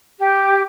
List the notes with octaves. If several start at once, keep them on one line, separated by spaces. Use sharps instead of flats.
G4